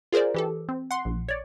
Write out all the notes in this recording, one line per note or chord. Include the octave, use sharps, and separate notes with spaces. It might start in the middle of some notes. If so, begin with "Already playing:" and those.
F4 G#4 A#4 C5 D5
E3 G4 A4
C4
F#5 C6
A#1
C#5 D5